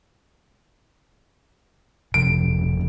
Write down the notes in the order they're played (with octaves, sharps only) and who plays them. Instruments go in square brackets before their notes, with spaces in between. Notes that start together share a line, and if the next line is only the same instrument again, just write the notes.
[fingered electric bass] G1 F2 C3 [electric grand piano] D7